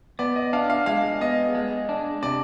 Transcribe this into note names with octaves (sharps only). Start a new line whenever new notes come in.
B3 D5
D#5
D4 F5
F5
G#3 F5
B3 D#5
G#3
D4
C3 D5